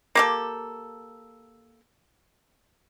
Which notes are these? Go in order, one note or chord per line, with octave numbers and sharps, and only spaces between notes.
A#3 G4 A4